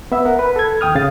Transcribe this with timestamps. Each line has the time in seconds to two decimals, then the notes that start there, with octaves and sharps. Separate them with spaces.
0.12 B3 E5
0.25 A#4 F#5
0.39 B4
0.56 A4 G#6
0.81 D#2 G5 D#6 F6
0.95 C#3 F5 A6